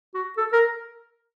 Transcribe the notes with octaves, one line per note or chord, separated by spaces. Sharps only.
F#4
A4
A#4